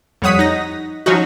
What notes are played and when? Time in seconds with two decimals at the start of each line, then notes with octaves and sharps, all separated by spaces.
0.22 F2 G3 C#5 F#5 D#6 B6
0.39 D#4 A#6
1.06 F3 F#3 C#4 D#4 F#4